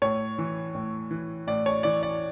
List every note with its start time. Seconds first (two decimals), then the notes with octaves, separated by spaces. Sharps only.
0.02 A2 C#5
0.38 E3
0.75 A2
1.11 E3
1.47 A2 D5
1.66 C#5
1.83 E3 D5
2.03 D5